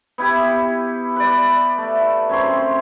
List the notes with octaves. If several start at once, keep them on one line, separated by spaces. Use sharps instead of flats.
B3 E4 G4
B4 D5
A3
F#2 C4 C#5 C6